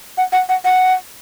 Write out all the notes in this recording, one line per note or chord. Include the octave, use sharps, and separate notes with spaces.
F#5
F#5
F#5
F#5